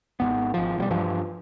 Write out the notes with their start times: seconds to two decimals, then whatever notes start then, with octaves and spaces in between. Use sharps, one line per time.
0.20 G#1 F#2 B3
0.54 G#1 F3
0.78 B1 F#3 G3
0.90 G2 E3 F3